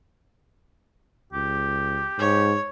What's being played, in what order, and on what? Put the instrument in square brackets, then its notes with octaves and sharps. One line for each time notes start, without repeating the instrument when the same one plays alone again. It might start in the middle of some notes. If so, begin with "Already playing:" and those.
[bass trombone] C#2 [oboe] G4
[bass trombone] G#2 [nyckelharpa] C#5